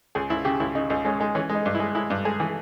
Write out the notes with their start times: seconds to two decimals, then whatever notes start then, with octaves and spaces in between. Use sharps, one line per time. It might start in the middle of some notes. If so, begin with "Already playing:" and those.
0.15 C#2 G#4
0.30 C#2 E4
0.45 C#3 G4
0.60 C#2 E4
0.75 C#3 D#4
0.90 C#2 D#4
1.05 G#3 C#4
1.20 G#3 D#4
1.35 E3 C#4
1.49 G#3
1.55 D#4
1.66 G2
1.75 E4
1.80 G#3
1.95 G#3 E4
2.10 G2
2.25 G#3 G#4
2.40 E3